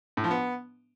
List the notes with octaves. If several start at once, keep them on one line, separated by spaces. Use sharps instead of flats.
A2
F3
B3